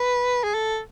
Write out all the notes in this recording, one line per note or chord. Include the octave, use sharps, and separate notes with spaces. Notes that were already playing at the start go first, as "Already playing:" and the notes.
Already playing: B4
G#4
A4